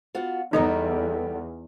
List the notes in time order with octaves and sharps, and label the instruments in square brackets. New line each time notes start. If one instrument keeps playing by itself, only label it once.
[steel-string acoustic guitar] B3 F4 F#4
[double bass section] E2 [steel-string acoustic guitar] G3 B3 A4 [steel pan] D#4